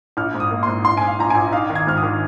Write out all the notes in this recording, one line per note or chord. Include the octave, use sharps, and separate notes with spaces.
A#1 F6
G#2
D#6
A#3
G#2 C6
A#1 C6
G#2 G#5
F5
A#1 A#5
A#1 G#5
D#4 F5
D#3
G#6
G#2 F6
D#6
D#3